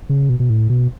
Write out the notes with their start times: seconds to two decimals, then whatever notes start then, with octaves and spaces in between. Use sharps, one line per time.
0.09 C#3
0.29 B2
0.40 B2
0.50 A2
0.69 B2